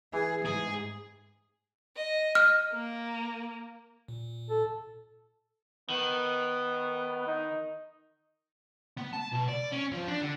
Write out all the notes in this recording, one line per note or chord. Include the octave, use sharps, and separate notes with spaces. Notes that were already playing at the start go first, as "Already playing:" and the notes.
E3 G#4
G#2 G#4
D#5
F6
A#3
A#2
A4
D#3 B3
D#4
B3
A5
B2
D5
C#4
F3
D4
D3